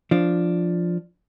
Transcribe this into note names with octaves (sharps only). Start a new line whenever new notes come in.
F3 D4